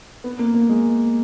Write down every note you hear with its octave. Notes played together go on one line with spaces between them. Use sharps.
B3
A#3
A#3
G#3